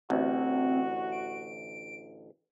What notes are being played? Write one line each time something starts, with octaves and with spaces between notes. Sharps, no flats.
A1 D2 C4 F#4
D7